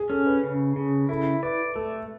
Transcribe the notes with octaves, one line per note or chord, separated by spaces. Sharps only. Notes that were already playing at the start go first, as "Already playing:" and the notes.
Already playing: G#4
C#4 A4
B4
C#3
C#3
E4 A4
B4 D5
A3 A4